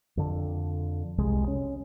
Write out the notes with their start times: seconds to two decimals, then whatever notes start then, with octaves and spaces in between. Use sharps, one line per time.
0.17 F2 D3
1.18 C2 C3 G#3
1.48 C#4